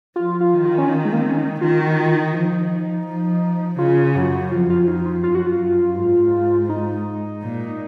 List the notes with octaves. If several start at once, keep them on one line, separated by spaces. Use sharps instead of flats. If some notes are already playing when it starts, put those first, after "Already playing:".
F3 F4
F4
D#3
F4
C#4
D#4
G#3
A#3
C4
C#4
D#4
D#3 F4
F#4
F4
D#4
F3 D#4
F3
C#3 F4
F#2 F#4
F2 F4
F4
D#4
F4
F#2 F4
F#4
F4
F#2
G#2
D#4
A#2